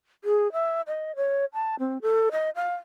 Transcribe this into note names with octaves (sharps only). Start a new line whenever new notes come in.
G#4
E5
D#5
C#5
A5
C4
A4
D#5
F5